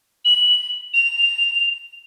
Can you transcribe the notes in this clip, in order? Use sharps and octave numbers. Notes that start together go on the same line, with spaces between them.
F#7
F7